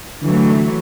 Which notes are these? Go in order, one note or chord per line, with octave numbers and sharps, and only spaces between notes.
D3 E3 F#3 A3